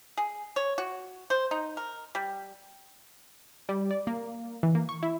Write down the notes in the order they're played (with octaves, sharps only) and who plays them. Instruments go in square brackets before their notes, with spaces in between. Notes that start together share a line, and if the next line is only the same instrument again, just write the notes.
[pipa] G#4
C#5
F#4
C5
D#4
A#4
G3
[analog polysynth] G3
D5
A#3
E3
A#3
C#6
E4